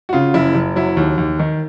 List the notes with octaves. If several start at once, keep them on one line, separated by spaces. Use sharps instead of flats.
F#4
C#3 F4
F#1 E4
F#1
F#3 E4
D#2
D#2
D#3